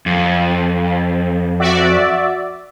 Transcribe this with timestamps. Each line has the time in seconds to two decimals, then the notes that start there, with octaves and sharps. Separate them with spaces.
0.06 F2
1.59 F#4 D5 E5